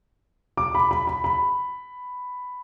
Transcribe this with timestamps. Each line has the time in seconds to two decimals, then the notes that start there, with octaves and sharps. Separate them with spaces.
0.57 D6
0.75 B5
0.91 B5
1.07 B5
1.24 B5